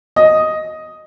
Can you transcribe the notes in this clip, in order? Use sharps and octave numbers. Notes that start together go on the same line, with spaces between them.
D#5